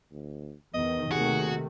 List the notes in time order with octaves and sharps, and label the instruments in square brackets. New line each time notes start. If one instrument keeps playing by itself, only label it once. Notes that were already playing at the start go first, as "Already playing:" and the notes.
[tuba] D2
[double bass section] E2 D#3 [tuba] B3 [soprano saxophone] D#5
[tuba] D#2 [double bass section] C3 D#3 A3 [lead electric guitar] F#4 [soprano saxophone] G#4